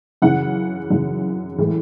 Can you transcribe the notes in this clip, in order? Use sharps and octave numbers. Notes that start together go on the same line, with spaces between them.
F#2 C#3 E3 F#5
F#2 C#3 E3
A2 E3 G#3